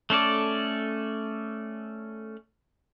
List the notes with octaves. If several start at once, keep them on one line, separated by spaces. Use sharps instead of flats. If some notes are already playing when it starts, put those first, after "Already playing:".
A3 C#4 A4 D5